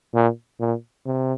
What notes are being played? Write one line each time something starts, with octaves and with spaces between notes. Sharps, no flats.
A#2
A#2
C3